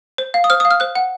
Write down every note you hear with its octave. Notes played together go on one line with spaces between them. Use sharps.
C5
F5
D#6
C5 F6
D#6
F5
F6
C5 F#6
F#5